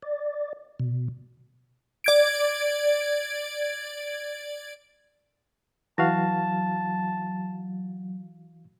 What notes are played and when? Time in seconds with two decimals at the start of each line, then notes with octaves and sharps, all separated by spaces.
0.03 D5
0.80 B2
2.04 D5 G#6 D7
5.98 E3 F#3 F#4 F5 A5